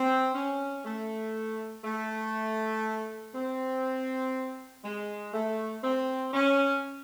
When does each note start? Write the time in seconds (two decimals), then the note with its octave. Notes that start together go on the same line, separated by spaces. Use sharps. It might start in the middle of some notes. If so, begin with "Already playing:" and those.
Already playing: C4
0.35 C#4
0.85 A3
1.84 A3
3.35 C4
4.84 G#3
5.33 A3
5.84 C4
6.34 C#4